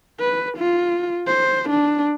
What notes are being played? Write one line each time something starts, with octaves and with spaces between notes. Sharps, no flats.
B4
F4
C5
D4